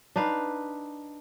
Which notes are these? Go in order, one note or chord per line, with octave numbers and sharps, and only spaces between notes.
D4 D#4 B4 F5